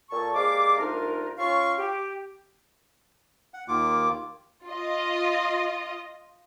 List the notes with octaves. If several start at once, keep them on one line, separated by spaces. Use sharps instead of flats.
A#2 A4 A5 C#6
G#3 A#3 G4 D5 F5 D6
C2 A3 D4 D#4 F4 A#4
C#4 F4 F5 C#6
G4
F#5
D#2 D#3 A#3 F4 D6
F4 D#5